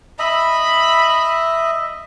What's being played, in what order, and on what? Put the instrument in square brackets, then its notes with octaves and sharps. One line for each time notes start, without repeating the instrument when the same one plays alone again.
[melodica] D#5 E5 [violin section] B5